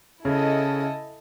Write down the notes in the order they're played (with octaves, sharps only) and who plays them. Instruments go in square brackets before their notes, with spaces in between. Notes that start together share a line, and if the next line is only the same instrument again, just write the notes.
[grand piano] C#3 C#4 [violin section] E4 A4 D#5